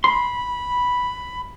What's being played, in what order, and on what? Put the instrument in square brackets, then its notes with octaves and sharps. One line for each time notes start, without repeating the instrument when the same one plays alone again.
[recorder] B5 [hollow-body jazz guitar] C6